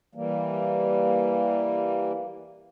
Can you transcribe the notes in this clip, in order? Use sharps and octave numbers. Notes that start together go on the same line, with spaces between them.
E3 G3 A#3